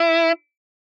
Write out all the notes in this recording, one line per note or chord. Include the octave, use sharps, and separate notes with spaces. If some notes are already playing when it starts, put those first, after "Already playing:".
Already playing: E4